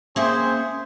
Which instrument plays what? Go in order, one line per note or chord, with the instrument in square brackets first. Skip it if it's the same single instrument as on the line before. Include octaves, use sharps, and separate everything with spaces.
[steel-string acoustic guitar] A#3 C#4 E5 [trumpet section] C4 G#4 C5